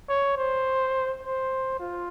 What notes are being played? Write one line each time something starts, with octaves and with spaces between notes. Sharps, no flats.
C#5
C5
C5
F4